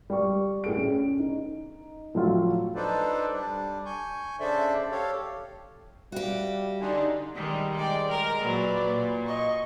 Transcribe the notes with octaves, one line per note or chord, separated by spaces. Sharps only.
G3 C#6
A2 G#4 D7
C#4
D#4
A2 F3 F#3 A3 F4
D4 D#4 A4 B4 C5 D5
G3 D4
G#5 C#6 G6
C#3 D4 A4 C5 D5 E5
G4 A4 C#5 F5
G3 F#4 G4 E5 F5
D3 D4 D#4 D5 G#5 C6
D#3 G3 G#3
G#3 D5 G5
G#3 A#4
A#2 F#3 B4 D5
A#2
D#5 C#6